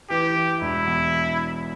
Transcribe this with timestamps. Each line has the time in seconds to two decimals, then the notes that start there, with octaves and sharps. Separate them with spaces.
0.10 E3 G4
0.35 E3
0.61 E1 E4
0.86 E2